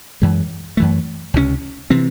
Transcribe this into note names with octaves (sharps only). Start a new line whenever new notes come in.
F#2 E3 G#3
F#2 E3 A3
C#2 C3 F#3 C#4
C3 E3 C4